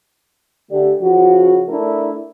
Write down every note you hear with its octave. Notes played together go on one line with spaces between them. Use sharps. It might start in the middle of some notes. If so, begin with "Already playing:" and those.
D3 A3 G4 D5
C#3 F3 F#4
A3 D4 E4 A#4